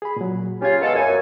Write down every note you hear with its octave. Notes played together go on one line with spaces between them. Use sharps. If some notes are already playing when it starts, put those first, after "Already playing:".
G#4 B5
A#2 F#3
C#3 C#4 F4 G4 G#6
G#3 B3 A4 A#4 F5
F#2 G#5